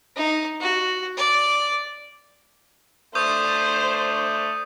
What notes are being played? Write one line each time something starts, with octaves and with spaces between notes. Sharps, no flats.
D#4
F#4
D5
A3 D4 C5 C#6 D#6 G6